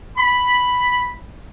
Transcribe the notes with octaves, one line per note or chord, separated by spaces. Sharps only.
B5